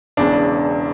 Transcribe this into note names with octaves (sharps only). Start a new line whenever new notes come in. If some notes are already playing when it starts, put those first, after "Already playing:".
E1 E2 C#3 D4